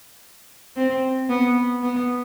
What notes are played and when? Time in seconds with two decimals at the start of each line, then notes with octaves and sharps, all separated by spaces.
0.77 C4
1.30 B3
1.83 B3